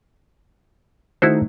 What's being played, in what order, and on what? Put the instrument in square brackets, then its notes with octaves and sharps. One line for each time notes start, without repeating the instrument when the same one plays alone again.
[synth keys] D#3 A3 D#4 [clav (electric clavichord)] E4 F#4 C5